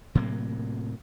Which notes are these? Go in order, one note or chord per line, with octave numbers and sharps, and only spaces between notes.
A2 C3 F#3 A#3